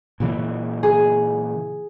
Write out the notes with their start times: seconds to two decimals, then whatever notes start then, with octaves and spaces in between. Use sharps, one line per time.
0.20 A#2 C#3 E3
0.83 G#4